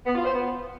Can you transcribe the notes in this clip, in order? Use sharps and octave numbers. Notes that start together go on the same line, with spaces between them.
B3
F4
C5
B3